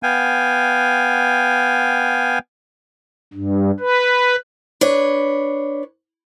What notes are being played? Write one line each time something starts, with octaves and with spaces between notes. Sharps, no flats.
B3 F5 G5 G#5
G2
B4
D4 B4 C#5